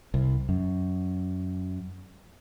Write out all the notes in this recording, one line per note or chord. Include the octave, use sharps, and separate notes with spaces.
C2
F#2